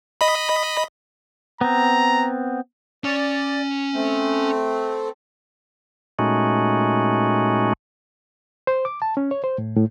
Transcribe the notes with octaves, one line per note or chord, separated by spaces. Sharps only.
D#5 B5
B3 C4 A#5
C#4 D5 G#5
A3 C4
A#2 G#3 A3 C#4 D#4 F#4
C5
D6
A5
C#4
C#5
C5
A2
A2